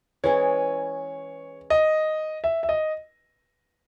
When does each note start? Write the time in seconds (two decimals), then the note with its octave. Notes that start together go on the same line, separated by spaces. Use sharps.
0.24 E3 G#3 C#4 G#4 C#5
1.70 D#5
2.44 E5
2.63 E5
2.69 D#5